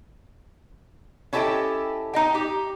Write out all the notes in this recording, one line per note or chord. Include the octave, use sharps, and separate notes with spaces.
C#4 E4 G4 A4 D#5 G5
D#4 D#5 G5
G4